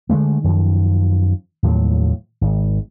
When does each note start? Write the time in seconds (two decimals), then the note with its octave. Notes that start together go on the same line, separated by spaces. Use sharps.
0.09 D3 F3 G#3 A3
0.44 F#2 D#3 F3
1.63 D#2 A2 F3 F#3
2.41 G#1